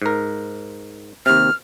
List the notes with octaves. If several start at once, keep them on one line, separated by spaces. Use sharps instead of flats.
G#2 A#4
D#2 C3 F6